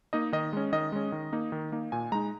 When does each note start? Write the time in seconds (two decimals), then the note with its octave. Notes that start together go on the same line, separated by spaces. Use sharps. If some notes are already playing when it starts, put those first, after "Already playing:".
0.13 A#3 D#4 D#5
0.33 D#3 D#5
0.53 G#3 C#4
0.72 D#3 D#5
0.92 G#3 C#4
1.12 D#3
1.33 A#3 D#4
1.52 D#3
1.72 A#3 D#4
1.92 A#2 G#5
2.12 G#3 D#4 A#5